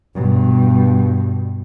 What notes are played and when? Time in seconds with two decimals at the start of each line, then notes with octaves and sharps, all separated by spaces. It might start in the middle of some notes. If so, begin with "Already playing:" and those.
0.15 G2 B2